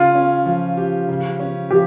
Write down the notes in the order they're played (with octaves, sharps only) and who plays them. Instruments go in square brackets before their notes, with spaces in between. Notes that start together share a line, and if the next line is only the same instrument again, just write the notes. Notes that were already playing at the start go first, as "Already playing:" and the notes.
Already playing: [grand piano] C#3 [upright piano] F4
[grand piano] C#4
F3
G4
C#3
C#4
[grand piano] F3 [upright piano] G4